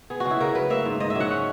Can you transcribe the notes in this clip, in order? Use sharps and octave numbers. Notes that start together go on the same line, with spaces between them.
B3 G#4
F#4
C#3 E4
C#3 A#4
F#3 B4
A#3 E5
G#2
G#2 D#5
E5
F#3
F#5
C#4